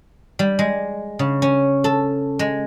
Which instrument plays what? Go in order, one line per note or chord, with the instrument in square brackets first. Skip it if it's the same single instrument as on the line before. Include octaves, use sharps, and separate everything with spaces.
[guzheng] G3
G#3
C#3
C#4
A4
G#3